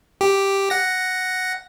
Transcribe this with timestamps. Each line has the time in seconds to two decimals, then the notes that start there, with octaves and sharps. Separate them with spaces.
0.21 G4
0.70 F#5 A#6